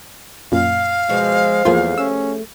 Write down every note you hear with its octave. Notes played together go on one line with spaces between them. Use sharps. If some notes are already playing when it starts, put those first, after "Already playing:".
F#2 A#2 F5
B2 F3 G#3
E2 F3 A3 A#3 F4 G4 G#4
C#4 E6